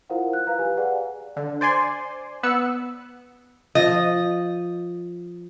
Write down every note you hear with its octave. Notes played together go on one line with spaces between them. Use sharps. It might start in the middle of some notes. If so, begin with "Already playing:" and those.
E4 F4 A#4 C5 F5 F#5
F#6
B4 F5 A#5 F#6
G4 B4 G#5
G#4 B4 D5 F5 F#5 G#5
D3
C5 D5 G#5 C6
B3 B4 E6 C#7
F3 D#5